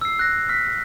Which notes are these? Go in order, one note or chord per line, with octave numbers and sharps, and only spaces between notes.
E6 C7
F#6 A#6
F6 B6